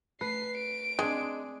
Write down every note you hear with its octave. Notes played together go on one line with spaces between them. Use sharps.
A3 B4 C7
D7
G#3 C4 D4 G#4